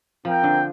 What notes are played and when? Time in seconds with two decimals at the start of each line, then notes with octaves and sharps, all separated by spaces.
0.25 F3 C4 A#4 G5
0.43 D3